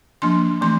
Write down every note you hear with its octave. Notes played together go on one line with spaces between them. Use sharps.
F3 A#3 D4 C6
E3 A3 C4 C6